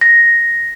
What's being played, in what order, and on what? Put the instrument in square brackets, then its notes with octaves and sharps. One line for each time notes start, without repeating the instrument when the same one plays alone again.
[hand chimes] A#6